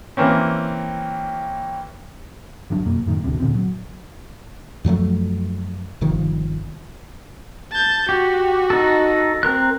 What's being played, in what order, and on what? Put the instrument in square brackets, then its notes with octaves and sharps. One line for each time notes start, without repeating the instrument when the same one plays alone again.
[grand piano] E3 A#3 C4 C#4
[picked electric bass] G1 G2 F#3 D4
F1 F#2 B2 A#3
F#2 A2 D#3
A1 D2 G2 C3
A#2 D3 C4
F#3
[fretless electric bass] F#2 F3 F#3 A3
G1 C3 D#3 F3
[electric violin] A5 G6
[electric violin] F#4 [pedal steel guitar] G4
[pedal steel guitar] D#4 A4
C4 A#4 F#6